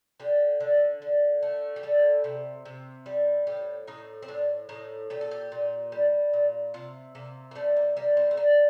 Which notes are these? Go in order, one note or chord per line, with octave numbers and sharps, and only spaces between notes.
D3 G4
D3
D3
A3
G4
G3 A4
C3
C3
G3
A2 G4
A2 D#4
C4
A2 D4
A2 D#4
A#2 G4
A4
G4
A#2
G3
A#2
C3 F4
C3 A#3
A#3
G3 A3
A#3
G3 A#3
C4
A3
G3 A#3